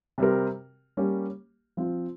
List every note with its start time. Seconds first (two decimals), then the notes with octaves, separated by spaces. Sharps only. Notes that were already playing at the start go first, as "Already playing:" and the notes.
0.18 C3 G3 C4 G4 A#4
0.97 G3 A#3 C#4 G4
1.77 F3 C4 F4